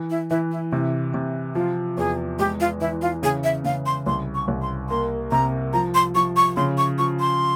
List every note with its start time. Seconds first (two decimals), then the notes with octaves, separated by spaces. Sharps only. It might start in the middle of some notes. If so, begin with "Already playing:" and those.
Already playing: E3
0.10 E4
0.30 E3 E4
0.51 E4
0.72 C3 E4
1.14 C3
1.55 F3 F4
1.97 E2 G#4
2.39 G#3 G4
2.60 F4
2.80 E3 E4
3.02 F4
3.23 C#3 G#4
3.44 E5
3.64 C#3 F5
3.86 C6
4.06 C2 C6
4.35 C#6
4.48 C2
4.62 C6
4.89 A#3 C6
5.31 C3 A#5
5.73 F3 A#5
5.94 C6
6.15 F3 C#6
6.36 C#6
6.56 C#3 C6
6.77 C#6
6.98 F3 C#6
7.20 C6